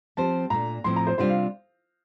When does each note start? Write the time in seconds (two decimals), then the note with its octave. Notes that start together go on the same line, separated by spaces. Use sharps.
0.17 F3 C4 G4 C5 A5
0.50 A#2 A3 D4 A#5
0.84 A2 F3 C4 C6
0.96 A#5
1.07 C5
1.18 C3 G3 D4 F4 C5
1.29 F5